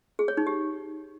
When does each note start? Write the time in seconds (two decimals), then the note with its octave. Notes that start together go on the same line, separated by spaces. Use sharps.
0.19 G#4
0.28 C#5
0.37 D#4
0.47 G4